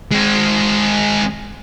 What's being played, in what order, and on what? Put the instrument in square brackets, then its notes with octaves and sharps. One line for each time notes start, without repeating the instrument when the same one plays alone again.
[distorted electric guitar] G#3 C4